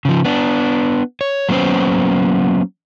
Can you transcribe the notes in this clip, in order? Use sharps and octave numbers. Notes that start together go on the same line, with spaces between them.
C#3 F3
B3 D4
C#5
F#3 A#3 B3 C#4 C5